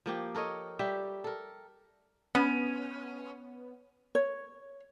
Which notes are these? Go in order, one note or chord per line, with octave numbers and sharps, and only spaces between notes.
F3 A#3 G4
A4 A#4 C#5 D#5
G3 G4 E5 G5
A4 A#4
B3 C#4
C#5